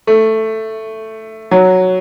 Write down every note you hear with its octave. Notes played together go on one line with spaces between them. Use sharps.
A3
F#3